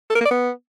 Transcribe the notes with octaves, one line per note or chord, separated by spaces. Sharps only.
A4
A#4
A#3
D5
B3